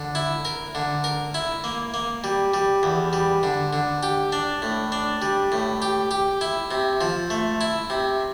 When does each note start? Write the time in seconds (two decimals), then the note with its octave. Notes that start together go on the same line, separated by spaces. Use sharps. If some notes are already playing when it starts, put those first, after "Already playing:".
Already playing: D3
0.15 E4
0.45 A#4
0.75 D3
1.04 A#4
1.34 E4
1.64 A#3
1.94 A#3
2.24 G3
2.54 G3
2.83 E2
3.13 G3
3.43 D3
3.73 D3
4.03 G4
4.32 D4
4.62 A2
4.92 D4
5.22 G3
5.52 A2
5.82 G4
6.11 G4
6.41 E4
6.71 C3
7.01 F3
7.30 A3
7.61 E4
7.90 C3